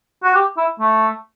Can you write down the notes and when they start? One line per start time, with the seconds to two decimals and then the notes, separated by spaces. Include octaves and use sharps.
0.24 F#4
0.34 G4
0.57 E4
0.80 A3